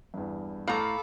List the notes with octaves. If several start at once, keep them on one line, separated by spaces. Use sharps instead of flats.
E2 G2
A2 A4 F5 A#5 B5 D6